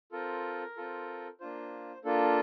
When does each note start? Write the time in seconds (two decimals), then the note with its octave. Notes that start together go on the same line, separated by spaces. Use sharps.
0.12 C4 F4 A4 A#4
0.77 C4 F4 A4
1.40 A#3 D4 F4 C5
2.04 A#3 D4 F4 A4